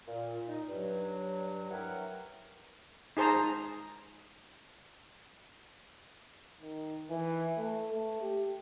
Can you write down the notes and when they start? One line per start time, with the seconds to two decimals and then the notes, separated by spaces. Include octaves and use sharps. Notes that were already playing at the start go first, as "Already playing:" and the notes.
0.07 A#2
0.48 D#4
0.68 G2 F#3
1.71 E4 G4 A#4 B4 C#5 F#5
3.17 D#4 G#4 C5 A5 A#5
6.62 D#3
7.10 E3
7.58 A3
7.90 A3
8.21 G4